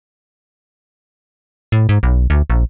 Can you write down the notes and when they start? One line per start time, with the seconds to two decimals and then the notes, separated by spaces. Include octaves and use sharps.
1.72 A2
1.89 G#2
2.03 B1
2.30 D2
2.50 A#1